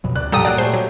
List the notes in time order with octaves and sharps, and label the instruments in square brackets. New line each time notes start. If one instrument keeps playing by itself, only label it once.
[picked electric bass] F2 B2 F#3
[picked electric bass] D2 C3 [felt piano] D5 F#6
[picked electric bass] G2 A#2 F3 [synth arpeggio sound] G3 A4 D#6 [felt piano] G5 A#5
[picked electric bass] A#2 [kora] F#3 A#3 F#5 [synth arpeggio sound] D5
[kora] G#3 A3 G4 [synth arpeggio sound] C5
[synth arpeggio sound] F#3